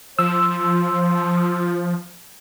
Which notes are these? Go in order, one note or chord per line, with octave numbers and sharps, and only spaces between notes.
F3 C5 E6